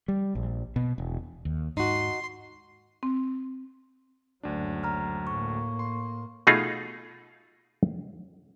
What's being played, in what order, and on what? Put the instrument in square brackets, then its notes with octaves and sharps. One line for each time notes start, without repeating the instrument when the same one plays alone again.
[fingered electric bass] G3
A#1
B2
E1
[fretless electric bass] D#2
[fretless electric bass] G#2 [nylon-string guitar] D#4 F#4 [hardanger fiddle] C6
[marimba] C4
[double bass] F#1 F#3 [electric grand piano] D2 D4
[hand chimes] A#5 F6
[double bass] A2 A#3 [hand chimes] C#6
[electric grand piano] C6
[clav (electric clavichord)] B2 A3 D#4 F4 G#4